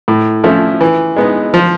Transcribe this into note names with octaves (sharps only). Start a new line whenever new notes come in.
A2
F3 A3 C#4 E4
E3
G#3 B3 D#4
F3